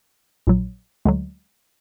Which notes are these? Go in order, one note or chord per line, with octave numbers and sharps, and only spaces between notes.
A#1 A#2 F#3
D2 D3 F#3 G#3